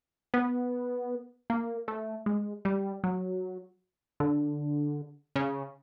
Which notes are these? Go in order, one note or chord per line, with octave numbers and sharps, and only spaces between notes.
B3
A#3
A3
G#3
G3
F#3
D3
C#3